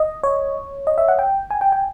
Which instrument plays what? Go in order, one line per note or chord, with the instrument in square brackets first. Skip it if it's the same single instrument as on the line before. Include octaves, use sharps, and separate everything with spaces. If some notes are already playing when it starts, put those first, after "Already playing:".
Already playing: [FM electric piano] D#5
C#5
D#5
E5
F#5
G5
G#5
G5
G5